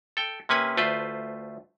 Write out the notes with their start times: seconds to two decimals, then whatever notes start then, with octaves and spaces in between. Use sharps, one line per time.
0.17 A4 G5
0.49 C3 A#3 C#4 B4 G#5
0.77 D2 A3 F4 B4 C5